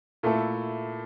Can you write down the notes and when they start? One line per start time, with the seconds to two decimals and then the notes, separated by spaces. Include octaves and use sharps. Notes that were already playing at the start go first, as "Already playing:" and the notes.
0.23 A#2 A3 E4 A4